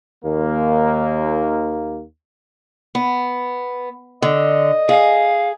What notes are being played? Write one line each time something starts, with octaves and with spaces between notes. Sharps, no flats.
D#2 A#3
B3
D3 D#5
G#4 F5